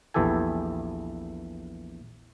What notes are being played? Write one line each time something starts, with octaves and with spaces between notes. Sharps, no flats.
A#1 E2 E3 G4 A4 G#5